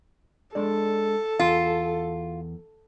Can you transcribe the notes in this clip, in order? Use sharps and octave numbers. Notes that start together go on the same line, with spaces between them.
G#3 D4 A4 D5
E2 F4